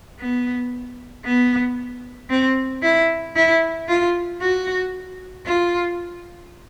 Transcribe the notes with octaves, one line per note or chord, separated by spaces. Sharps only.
B3
B3
C4
E4
E4
F4
F#4
F4